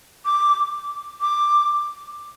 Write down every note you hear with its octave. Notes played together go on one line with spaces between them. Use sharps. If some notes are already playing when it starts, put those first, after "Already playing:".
D6
D6